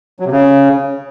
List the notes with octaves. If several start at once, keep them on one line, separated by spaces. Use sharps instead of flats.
F#3
C3
C#3